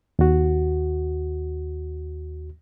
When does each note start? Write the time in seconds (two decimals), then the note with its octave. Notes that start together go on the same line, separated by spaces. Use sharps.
0.19 D#2 F#4